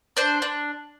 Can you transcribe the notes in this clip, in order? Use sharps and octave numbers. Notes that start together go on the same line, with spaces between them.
D4 C5
D4